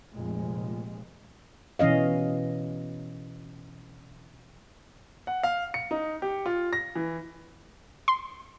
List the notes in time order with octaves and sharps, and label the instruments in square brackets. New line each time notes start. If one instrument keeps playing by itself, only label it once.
[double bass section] F1 F2 A#2 G#3
[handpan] B2 E3 C#4 D#5 F5
[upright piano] F#5
F5
C#7
D#4
G4
F4
A#6
E3
[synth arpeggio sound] C6